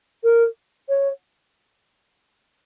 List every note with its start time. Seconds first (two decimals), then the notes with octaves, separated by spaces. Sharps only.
0.24 A#4
0.89 C#5